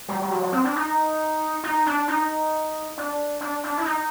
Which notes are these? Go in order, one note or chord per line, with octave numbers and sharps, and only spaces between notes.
G3
G3
F#3
F#3
C4
D4
D#4
D#4
D4
D#4
D4
D4
D4
E4
D#4